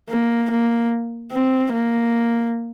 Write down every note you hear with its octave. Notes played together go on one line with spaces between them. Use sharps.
A#3
A#3
C4
A#3